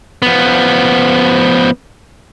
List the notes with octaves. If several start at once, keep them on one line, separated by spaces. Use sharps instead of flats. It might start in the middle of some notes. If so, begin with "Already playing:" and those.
F3 B3